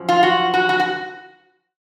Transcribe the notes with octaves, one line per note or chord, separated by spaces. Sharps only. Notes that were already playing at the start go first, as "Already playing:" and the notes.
Already playing: F#2 F3
F4
F#4
F#4
F#4
F#4